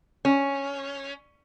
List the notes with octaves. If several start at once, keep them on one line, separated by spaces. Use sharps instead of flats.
C#4